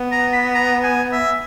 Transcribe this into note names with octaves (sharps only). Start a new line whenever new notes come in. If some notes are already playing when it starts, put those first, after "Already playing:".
Already playing: B3
A#5
B5
A#5
G#5
E5